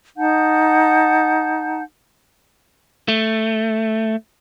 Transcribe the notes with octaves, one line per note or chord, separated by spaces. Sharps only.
D#4 F#5 A5 G6
A3